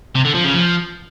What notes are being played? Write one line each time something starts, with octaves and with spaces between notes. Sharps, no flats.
C3
D3
F3
C#3
F3